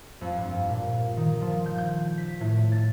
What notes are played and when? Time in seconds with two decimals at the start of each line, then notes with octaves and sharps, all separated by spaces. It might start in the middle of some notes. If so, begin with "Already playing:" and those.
0.21 F2
0.37 G2
0.69 A#2
1.17 D#3
1.41 F3
1.66 G6
1.78 G6
2.18 B6
2.40 A2
2.72 A6